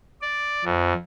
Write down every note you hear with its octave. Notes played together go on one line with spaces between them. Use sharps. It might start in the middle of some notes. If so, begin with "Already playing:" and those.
D5
F2